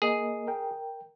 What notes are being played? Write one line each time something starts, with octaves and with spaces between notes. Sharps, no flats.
A#3 G#4 A#4 D#5
A#4 G5